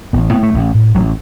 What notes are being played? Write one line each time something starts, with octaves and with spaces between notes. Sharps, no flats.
A1 B3
A2 B3
A3
A1
A2
A1 F#3